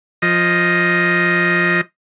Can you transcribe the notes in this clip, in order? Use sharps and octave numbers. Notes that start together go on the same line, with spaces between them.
F3 D#5